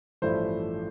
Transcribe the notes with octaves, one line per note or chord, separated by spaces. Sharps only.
A1 G2 F3 A3 E4 C5